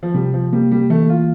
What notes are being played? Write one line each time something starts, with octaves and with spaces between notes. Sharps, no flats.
F3
C3 G3
F3
G3 A#3
G3
E3 A3
F4